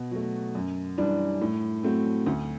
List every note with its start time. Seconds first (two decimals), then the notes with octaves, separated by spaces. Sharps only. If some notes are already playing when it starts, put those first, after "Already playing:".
Already playing: B2
0.11 F#3 A3
0.55 F#2
0.98 E3 G3 D4
1.41 A2
1.83 F#3 A3 C4
2.26 D2